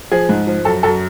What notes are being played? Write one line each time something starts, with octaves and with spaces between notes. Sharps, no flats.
F3 G#4
G#2
F3
F#2 A4
F#2 A4